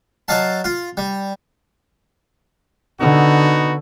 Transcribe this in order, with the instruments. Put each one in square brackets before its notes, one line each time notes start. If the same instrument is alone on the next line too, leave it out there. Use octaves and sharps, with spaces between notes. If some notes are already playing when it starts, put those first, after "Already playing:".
[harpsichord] F#3 D#5 F5 A5
F4
G3
[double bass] D3 [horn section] B3 D#4 F#4